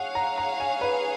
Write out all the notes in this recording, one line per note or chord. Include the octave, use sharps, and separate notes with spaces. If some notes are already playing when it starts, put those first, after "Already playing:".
Already playing: G#4 C#5 F5 F#5
A#5
A#5
G#5
B4